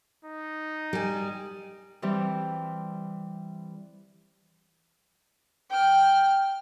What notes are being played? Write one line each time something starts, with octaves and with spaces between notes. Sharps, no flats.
D#4
G3 G#5
E3 G3 C4
G5 F6